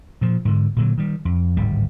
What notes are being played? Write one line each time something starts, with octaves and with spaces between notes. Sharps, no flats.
A#2 F3
G#2 D3
A#2 D3 F#3
D#3 G3
F2
D1 G#1 G3